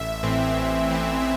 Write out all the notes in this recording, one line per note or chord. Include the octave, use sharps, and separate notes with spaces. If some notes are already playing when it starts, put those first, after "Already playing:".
Already playing: A1 E5
A2 E3 C4
A1
A2 E3 C4
E5